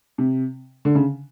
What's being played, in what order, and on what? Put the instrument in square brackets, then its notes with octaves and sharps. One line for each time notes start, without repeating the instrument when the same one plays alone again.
[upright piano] C3
D3
C#3